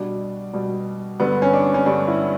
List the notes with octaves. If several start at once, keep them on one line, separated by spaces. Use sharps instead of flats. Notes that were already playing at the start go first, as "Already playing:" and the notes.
Already playing: B2 G3 D4
B2 G3
G2 D3 G3 B3
C#4
D4
C#4
G2 D3 G3 D4
E4